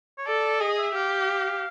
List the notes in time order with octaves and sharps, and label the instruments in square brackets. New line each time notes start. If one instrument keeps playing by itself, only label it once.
[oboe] C#5
[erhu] A4 [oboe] D5
[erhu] G#4 [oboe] D#5
[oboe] E5
[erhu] G4 [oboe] F5